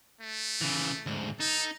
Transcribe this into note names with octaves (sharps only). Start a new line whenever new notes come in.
A3
C#3 E3
D2 G#2
D#4 A4